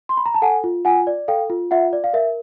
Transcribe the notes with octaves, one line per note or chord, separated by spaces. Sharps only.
C6
B5
A#5
A5
A4 F#5 G#5
F4
F4 F#5 G#5
D5
A4 F5 G5
F4
F4 E5 F#5
D5
F5
A#4 E5